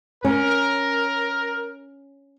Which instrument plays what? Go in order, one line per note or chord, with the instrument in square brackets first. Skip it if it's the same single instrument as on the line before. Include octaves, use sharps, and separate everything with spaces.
[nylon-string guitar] C#4 [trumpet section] A#4